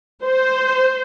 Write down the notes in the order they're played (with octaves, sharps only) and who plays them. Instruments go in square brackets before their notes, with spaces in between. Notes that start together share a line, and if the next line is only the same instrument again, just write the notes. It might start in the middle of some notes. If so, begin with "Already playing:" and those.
[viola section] C5